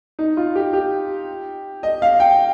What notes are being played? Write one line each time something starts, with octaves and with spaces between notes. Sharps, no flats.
D#4
F4
G4
G4
D#5
F5
G5